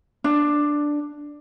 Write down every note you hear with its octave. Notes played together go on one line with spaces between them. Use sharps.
D4